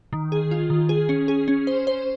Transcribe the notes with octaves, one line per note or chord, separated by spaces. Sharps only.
D#3
G#4
F4
D#3
G#4
C#4
G#4
C#4
C5
C5